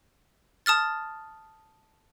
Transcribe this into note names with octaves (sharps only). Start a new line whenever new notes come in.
A5 D#6 F6 A6